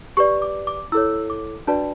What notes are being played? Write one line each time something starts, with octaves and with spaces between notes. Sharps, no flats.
G4 B4 D5 C#6
D6
D6
E4 A4 C#5 E6
D6
D4 F#4 B4 D5 A5